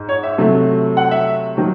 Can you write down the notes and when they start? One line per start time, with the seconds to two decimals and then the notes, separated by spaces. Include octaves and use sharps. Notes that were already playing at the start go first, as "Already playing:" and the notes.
Already playing: G#2
0.09 C#5
0.23 E5
0.38 C3 F#3 A3
0.97 F#5
1.11 E5
1.57 D#3 F#3